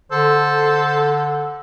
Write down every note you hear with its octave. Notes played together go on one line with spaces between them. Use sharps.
D3 A4 C5